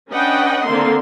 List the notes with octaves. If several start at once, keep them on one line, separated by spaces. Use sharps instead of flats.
C#4 D4 B4 D#5 F#5 G5
D3 D#3 A#3 C4 A#4 C6